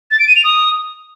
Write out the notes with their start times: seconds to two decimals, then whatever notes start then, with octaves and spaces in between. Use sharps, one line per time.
0.11 A6
0.19 D7
0.28 D#7
0.36 F7
0.44 D#6